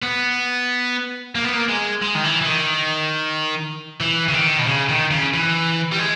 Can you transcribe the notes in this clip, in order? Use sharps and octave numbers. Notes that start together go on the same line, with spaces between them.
B3
A#3
B3
A#3
G#3
G#3
D#3
E3
E3
D#3
E3
C#3
D#3
B2
C#3
D#3
C#3
E3
G3
G#3